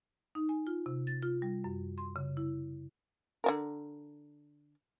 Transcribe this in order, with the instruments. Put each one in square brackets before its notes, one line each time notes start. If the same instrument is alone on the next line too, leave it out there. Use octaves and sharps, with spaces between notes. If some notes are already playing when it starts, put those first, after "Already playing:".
[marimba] D#4
G#5
F4
C3
A6
F4
G3
F#2
C6
C#3
E4
[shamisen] D3 G3 A#4